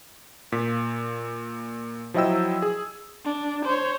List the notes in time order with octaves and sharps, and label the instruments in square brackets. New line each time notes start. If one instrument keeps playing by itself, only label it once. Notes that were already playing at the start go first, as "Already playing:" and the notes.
[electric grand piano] A#2 B6
F3 F#3 E4 D#5 G5 E6
G#4
[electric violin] D4
C5 C#5